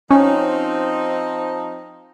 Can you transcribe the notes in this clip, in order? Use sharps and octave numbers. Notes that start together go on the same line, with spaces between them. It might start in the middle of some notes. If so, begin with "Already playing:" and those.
F3 C4 C#4 D#4